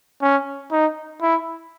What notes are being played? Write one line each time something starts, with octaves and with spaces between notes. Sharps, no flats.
C#4
D#4
E4